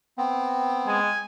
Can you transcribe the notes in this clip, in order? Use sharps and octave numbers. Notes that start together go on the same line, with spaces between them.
B3 C4
G#3 G#5